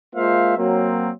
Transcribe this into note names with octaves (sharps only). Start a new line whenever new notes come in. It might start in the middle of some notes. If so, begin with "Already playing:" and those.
G#3 A#3 F4 C5 E5 F5
F#3 A#3 C4